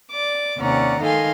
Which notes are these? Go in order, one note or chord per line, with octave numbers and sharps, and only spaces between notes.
D5 D6
D#2 C3 C#4 D5 F#5 A#5
D#3 D#4 A4 F5 G#5 C6